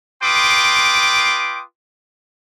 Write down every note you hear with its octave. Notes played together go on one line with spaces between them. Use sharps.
F4 B4 G5 C6 D6 D#6